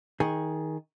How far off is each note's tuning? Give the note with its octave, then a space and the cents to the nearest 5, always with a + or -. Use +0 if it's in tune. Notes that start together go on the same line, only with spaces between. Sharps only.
D#3 +20 G#4 +0